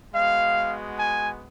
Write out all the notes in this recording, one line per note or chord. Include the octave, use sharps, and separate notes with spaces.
G#3 B3 F#4 F5
G#5